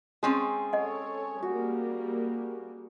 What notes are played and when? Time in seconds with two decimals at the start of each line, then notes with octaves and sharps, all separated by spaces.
0.23 G#3 C4 C#4 G#4 G5 A5
0.73 A4 C#5 D#5 F#5
1.42 G3 A#3 F#4